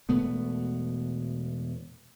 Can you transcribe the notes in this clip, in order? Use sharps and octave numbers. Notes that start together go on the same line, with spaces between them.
E1 B2 A3 B3